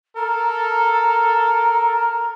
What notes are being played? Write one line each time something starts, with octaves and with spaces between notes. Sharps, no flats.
A4 A#4 A#5